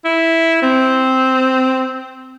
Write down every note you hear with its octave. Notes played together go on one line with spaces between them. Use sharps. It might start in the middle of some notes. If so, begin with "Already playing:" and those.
E4
C4